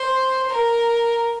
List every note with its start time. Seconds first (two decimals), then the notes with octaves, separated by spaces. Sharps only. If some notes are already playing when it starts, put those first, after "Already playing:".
Already playing: C5
0.49 A#4